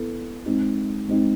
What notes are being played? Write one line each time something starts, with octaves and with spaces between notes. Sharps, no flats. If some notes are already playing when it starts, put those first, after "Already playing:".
Already playing: B3 E4 A4
G#3 C4 D#4
G#3 C4 D#4